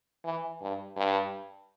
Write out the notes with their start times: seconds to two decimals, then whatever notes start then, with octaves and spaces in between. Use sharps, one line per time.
0.25 E3
0.62 G2
0.96 G2